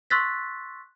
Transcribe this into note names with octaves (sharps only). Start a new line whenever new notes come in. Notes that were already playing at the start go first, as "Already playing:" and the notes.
C6 C#6 E6 F#6 A6 B6